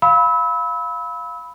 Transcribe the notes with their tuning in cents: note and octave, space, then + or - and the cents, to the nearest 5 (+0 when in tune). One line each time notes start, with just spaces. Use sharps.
F5 +0 B5 +0 E6 -30